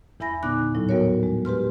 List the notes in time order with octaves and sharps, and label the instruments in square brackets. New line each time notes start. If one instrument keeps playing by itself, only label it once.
[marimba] E2 E4 E5 G#5 B5 A#6
A#2 D3 B3 D#4 D6 F#6
D#2 A2 F#3 E4
G3 B3 F#4 A#4 C#5
G#3
G4 B4 C6 F6